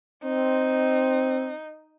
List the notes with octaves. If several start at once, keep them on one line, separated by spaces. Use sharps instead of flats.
C4 D#4